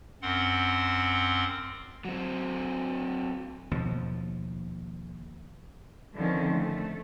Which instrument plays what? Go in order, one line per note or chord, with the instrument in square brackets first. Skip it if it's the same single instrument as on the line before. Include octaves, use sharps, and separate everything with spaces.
[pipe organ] F#2 C4 F#5 C6
[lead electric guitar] F#3 C4
[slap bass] D#2 B2 F3
[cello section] D3 D#3 F3 C4 C#4
A3